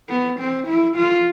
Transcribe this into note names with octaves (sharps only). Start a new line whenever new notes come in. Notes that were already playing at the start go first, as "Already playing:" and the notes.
B3
C4
E4
F4